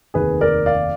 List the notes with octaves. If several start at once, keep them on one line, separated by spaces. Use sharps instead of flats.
F1 D#2 D#3 A#3 G#4 B4
A#4 D5
D5 F5